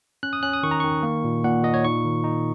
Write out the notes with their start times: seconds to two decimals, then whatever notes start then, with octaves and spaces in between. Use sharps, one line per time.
0.23 C#4 F#6
0.33 D#6
0.43 C#4 F#6
0.53 D#6
0.63 D#3 C#6
0.71 A#5
0.80 D#3 C#6
1.03 A#3
1.24 A#2
1.44 A#2 F#5
1.64 A#2 D#5
1.74 C#5
1.85 D#4 C#6
2.05 D#3
2.24 D#4